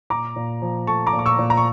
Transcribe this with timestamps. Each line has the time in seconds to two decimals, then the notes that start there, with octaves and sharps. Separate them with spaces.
0.10 A#2 A#5 D6
0.36 A#2
0.62 F3
0.87 A3 A5 C#6
1.06 A#5 D6
1.13 A#2
1.19 D6
1.26 C#6 E6
1.39 A#2
1.50 A#5
1.57 C#6